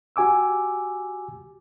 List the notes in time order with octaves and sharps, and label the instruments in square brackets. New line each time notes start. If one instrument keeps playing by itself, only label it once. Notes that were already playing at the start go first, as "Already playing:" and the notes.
[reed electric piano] F#4 G4 G#5 D6 E6